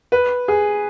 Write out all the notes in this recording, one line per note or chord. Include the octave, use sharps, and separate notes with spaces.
B4
G#4